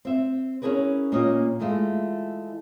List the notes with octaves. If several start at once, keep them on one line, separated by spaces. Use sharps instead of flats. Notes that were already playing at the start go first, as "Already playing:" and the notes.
C4 E5
C#4 D#4 E4 G#4 A#4 B4
A#2 A#3 C#4 D#5
E3 G#3 A3 F4